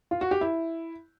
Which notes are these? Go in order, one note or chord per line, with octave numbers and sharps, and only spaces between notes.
F4
F#4
G4
E4